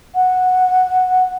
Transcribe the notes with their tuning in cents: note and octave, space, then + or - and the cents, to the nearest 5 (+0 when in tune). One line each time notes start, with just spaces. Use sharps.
F#5 -10